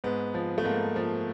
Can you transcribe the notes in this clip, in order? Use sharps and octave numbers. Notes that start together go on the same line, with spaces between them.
G#2 B3
F3
A3
G#2 A#3
F3